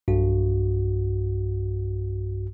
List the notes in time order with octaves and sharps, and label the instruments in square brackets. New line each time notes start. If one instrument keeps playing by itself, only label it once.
[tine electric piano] B1 G2 F#4